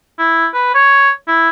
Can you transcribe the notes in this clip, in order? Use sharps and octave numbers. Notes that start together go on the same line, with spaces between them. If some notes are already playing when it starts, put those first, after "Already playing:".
E4
B4
C#5
E4